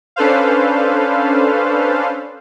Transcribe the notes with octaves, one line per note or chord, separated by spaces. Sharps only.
C#4 D4 A4 B4 C5 F5